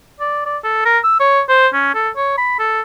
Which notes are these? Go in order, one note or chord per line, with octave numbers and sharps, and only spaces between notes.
D5
D5
A4
A#4
E6
C#5
C5
C#4
A4
C#5
B5
A4